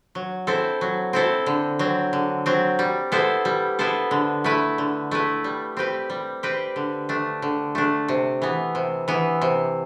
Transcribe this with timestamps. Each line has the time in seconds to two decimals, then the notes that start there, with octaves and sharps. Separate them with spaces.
0.15 F#3
0.47 C4 E4 A4 C5
0.81 F#3
1.13 C4 E4 A4 C5
1.46 D3
1.79 F#3 C4
2.13 D3
2.46 F#3 C4
2.79 G3
3.12 B3 E4 A4 C5
3.45 G3
3.79 B3 E4 A4 C5
4.11 D3
4.44 A3 E4 B4
4.78 D3
5.11 A3 E4 B4
5.44 G3
5.77 C4 G4 B4
6.10 G3
6.43 C4 G4 B4
6.76 D3
7.09 A3 D4
7.42 D3
7.75 A3 D4
8.08 C3
8.42 E3 B3
8.75 C3
9.08 E3 B3
9.41 C3